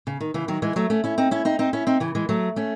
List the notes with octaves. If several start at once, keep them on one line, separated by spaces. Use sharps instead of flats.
C#3
D#3
C#3 E3
D#3 F#3
E3 G#3
F#3 A3
A3 C#4
C#4 E4
C4 D#4
C#4 E4
C4 D#4
C4 D#4
C#4 E4
C4 D#4
C#3 E3
E3 G#3
F#3 A3
A3 C#4